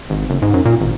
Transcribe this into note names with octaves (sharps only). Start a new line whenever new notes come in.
G#1
F#1
G#2
F#2
A#2
G#1